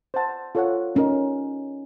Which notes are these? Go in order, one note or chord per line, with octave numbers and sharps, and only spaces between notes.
C5 F#5 A5
F4 A4 C#5 F#5
C#4 D#4 A#4 D#5